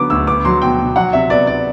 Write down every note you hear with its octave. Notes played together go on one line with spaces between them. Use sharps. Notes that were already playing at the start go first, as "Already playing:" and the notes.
Already playing: D3 F#3 B3 D6
D2 E6
B3 D6
F#3 C6
B2 G5
B2
F#3 F#5
C3 E5
B3 D5
D5